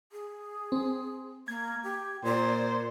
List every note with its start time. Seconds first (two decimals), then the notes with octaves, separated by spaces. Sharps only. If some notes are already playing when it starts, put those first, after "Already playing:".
0.12 G#4
0.72 C4
1.48 A#3 G#6
1.84 G4
2.25 A#2 C5 D5